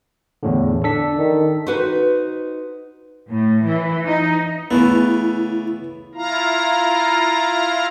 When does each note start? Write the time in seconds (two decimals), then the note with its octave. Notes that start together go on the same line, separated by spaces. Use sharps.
0.43 E2 A2 D3
0.84 D4 A4 B6
1.17 D#3
1.67 D#4 F#4 B4 C5
3.30 A2
3.67 E3
4.07 D#4
4.71 C#3 E3 A3 B3 E4
6.15 E4 F4 F5 A#5